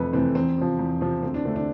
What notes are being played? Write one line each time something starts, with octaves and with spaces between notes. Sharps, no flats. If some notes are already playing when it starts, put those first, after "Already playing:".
Already playing: F2 C3 E3 A3 A4 B4
C3 E3 A3 C4
E2 C4
C3 F3
E2
C3 F3
D2 C4
D4
D3 A3 C4
D4